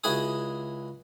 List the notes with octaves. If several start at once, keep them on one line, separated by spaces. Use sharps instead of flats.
C#2 E4 F#4 G#4 G#5 D#6